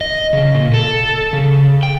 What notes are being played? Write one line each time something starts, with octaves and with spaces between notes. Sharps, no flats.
D#5
C#3
A#2
A4
C#3
G5